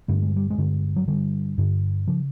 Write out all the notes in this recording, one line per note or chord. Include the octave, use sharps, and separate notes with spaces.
G2 D3 A3
G#3
G3
G#3
G2 D3
F#3
G2 D3 G3
G2 D3
C#3 F3